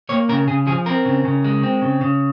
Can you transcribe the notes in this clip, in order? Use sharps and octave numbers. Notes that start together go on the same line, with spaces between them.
A#3 C#5
C#3 A#4
C#3 G#4
F3 G#4
C4 A#4
C#3
C#3
G#3
C4
C#3
C#3